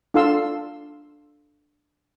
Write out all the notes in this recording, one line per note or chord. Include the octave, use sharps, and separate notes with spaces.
D4 F4 A4 F5 C6 E6